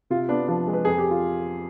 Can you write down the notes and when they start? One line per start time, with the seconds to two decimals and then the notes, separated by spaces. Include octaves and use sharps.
0.10 C3 F4
0.29 B3 D4
0.47 F3 D4
0.67 G#3
0.73 B4
0.85 F2 G#4
0.98 G4
1.11 F4